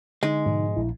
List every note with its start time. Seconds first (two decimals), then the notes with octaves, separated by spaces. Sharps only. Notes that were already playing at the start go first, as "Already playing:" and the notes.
0.23 D3 G#3 D#4
0.46 G#2 B2 F3
0.76 A#1 E4